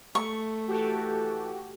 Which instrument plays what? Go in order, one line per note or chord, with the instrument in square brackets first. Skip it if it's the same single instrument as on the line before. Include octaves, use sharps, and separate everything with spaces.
[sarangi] A3 [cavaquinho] C#6
[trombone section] E3 A4 [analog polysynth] F#4 G4